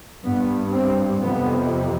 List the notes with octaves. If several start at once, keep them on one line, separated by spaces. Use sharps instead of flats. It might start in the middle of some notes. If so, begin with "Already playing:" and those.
G2 B3
C4
F2 C3 B3